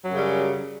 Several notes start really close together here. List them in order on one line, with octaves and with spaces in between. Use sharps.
F#3 F#2 C#3 G3